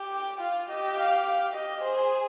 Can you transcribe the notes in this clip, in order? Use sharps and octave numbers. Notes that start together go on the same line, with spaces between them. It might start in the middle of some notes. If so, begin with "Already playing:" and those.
Already playing: G4
G5
F4 F5
G4 D#5
F5
F5
G4 D#5
G#4 C5